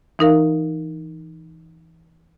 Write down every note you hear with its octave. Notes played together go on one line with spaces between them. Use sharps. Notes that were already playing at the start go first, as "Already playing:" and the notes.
E3 D#4 A#4 F5